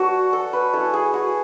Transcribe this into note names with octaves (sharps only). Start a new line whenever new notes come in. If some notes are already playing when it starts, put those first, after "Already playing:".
Already playing: F#3 B3 D4 F#4 A4 C#5
A4
B4
A3 C#4 E4 A4
G#4
F#4